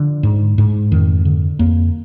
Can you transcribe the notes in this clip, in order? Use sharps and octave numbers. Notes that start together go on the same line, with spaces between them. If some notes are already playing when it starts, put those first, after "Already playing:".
Already playing: D3 F3
G#2
G#2
F2 D#3
D3
F2 A#3